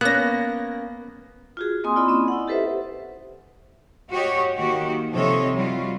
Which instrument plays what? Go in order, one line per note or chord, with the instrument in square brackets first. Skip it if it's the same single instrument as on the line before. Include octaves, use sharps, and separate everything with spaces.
[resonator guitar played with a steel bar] A#3 C#4 [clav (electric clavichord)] B3 [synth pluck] F#6 A#6
[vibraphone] F4 F#4 G#4
A#3 C4 D#5 G#5 C6 D#6
E4 F4 D5 D#5 B5 C6
C#4 D#5
E4 F#5
G4 A4 B4 C5 E5
[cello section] F#4 G4 C#5 D#5
D#3 A#3 F#4 G4
C3 F3 A4 C#5 D#5
G3 F4 F#4